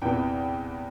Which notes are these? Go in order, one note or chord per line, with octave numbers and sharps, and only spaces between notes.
E2 C3 E3 G5